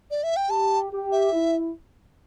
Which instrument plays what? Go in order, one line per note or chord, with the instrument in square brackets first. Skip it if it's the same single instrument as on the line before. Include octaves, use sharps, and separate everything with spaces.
[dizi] D5
E5
G5
[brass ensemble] G4 [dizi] A5
[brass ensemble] G4
[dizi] E5
[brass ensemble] E4